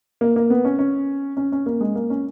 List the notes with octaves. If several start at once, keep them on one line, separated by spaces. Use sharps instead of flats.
A#3
A#3
B3
C#4
C#4
C#4
C#4
A#3
G#3
A#3
C#4